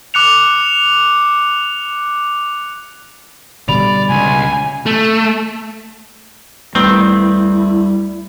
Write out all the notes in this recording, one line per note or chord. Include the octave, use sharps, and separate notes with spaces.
D6 F6 F#6 C#7 F7
B2 D3 G3 D5 B5 F7
C#2 G#5
A3
D2 D#3 G3 C4 E4 B4 B5